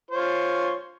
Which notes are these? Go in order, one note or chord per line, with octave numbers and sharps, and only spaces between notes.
F4 C5 C#5